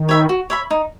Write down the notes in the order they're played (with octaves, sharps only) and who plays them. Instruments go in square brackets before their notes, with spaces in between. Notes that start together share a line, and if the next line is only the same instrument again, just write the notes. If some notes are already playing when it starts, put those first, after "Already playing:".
Already playing: [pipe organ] D#3
[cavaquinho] C#5 E5 B5
F#4
C#5 E5 B5
D#4